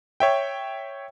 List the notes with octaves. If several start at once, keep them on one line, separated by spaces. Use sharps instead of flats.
C#5 E5 G5